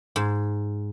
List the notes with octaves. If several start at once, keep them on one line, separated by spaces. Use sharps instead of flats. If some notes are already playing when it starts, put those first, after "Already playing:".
G#2